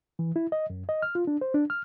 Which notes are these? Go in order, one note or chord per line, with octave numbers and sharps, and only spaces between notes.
E3
E4
D#5
F#2
D#5
F6
F4
D4
C5
D4
F6